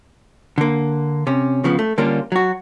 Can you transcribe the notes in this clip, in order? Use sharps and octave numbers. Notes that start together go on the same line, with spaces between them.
D3 A#3
C3 C#4
C#3 F3 B3
A3
D3 G3 A#3 C#4 D4 F4
F#3 F#4